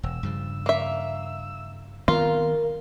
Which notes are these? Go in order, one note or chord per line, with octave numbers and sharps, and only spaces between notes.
E1 E6
G2 C#3 F3
A#3 E5
D#3 B3 C4 F4 A#4